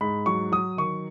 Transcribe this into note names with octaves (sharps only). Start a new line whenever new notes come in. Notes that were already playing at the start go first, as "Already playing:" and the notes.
G#2 B5
F#3 C#6
F#3 D#6
D#3 C#6